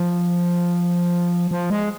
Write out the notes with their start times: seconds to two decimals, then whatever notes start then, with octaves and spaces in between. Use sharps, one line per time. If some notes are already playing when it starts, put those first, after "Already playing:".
Already playing: F3
1.51 F3
1.70 G#3